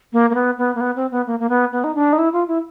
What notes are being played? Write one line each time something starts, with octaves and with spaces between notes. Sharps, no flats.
A#3
A#3
B3
B3
A#3
B3
C4
B3
A#3
A#3
B3
B3
D#4
D4
D#4
E4
F4
E4